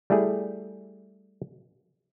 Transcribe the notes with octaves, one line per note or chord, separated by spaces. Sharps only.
G3 A3 E4 G#4